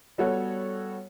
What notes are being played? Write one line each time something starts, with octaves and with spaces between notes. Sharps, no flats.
G3 B3 F#4 A4 C#5